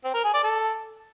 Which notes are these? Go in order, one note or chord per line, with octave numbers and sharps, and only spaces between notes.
C4
A#4
G#4
D5
A4